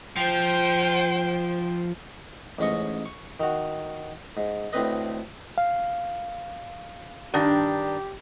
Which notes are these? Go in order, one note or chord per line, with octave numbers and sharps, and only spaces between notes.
F3 C5 G5
A1 G#2 C#4 D#5 C#6
C#6
D#3 F#4
G#2
D2 A2 C4 B4 D#5
F5
G2 D#3 D4 G4